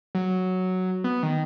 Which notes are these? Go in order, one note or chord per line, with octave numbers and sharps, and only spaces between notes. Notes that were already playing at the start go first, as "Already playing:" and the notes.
F#3
B3
D#3